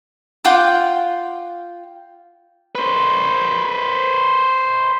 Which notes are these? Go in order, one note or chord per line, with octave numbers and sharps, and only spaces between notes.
F4 F#5 G5 D6
B4 C5